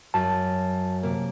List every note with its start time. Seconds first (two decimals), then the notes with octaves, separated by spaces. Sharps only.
0.14 F#2 A5
1.03 C3 A#3